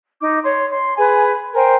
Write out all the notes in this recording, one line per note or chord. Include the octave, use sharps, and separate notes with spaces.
D#4 D6
C#5 C6
C6
G#4 B4 G#5
A#4 C5 G5 G#5